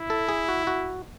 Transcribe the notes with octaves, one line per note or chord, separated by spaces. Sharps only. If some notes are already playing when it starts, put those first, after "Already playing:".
Already playing: E4
A4
G#4
F#4
F#4